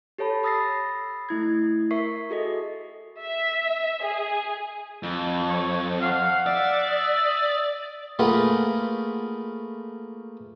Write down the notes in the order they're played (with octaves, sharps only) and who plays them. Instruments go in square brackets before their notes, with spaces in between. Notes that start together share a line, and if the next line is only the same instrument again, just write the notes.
[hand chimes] G4 A4 C#5 A5 B5
B5 D#6 E6 A6 A#6 C7
A3 E4 G#6
A#4 E5 C#6 B6 C7
F#4 G#4 A4 D#5
[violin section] E5
G#4
[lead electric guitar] F2
[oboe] C#5
[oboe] F5 [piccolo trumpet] F#5
[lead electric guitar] D5 [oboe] E5
[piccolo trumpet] D#6
[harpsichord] A3 A#3 F4 G#4 B4 F#5